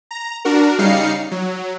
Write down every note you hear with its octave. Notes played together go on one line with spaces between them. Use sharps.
A#5
D4 F#4 A#4
C#3 G3 D#4 F5 C7 C#7
F#3